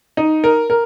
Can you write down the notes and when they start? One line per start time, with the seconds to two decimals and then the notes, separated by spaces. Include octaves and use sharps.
0.17 D#4
0.44 A#4
0.70 A#4